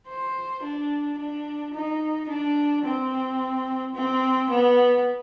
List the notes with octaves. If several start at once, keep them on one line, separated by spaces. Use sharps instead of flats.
C5
D4
D4
D#4
D4
C4
C4
B3